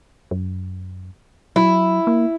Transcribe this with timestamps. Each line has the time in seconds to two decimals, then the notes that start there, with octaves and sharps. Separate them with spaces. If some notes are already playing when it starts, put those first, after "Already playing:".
0.31 F#2
1.56 F#3 E4
2.07 A#3